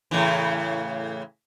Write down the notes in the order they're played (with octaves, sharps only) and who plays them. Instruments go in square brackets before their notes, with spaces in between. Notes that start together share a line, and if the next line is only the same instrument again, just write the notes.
[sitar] A2 C#3 E3